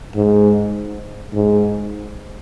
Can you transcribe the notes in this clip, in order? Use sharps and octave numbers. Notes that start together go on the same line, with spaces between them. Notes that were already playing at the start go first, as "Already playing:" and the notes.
G#2
G#2